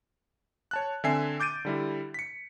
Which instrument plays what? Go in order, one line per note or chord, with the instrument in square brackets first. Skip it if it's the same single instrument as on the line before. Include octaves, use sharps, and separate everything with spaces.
[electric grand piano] C#5 A5 F#6
D3 C4 E5 G#5 C7
D6 G6 A6 D7 D#7
D3 G3 E4
B6 C#7